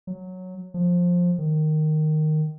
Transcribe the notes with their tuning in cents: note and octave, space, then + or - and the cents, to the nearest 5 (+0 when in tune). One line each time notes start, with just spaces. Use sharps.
F#3 -5
F3 +15
D#3 -10